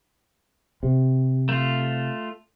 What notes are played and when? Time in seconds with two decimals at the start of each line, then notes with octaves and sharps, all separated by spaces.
0.83 C3
1.49 A3 F4